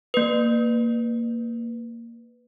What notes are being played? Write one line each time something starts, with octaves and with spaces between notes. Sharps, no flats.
A#3 B4